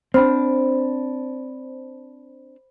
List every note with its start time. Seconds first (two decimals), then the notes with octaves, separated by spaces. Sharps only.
0.14 C4 D4 C5 B5